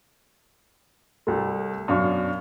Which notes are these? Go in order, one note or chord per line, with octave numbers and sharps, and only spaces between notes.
C2 A3
F#2 B2 D4 F5 C#6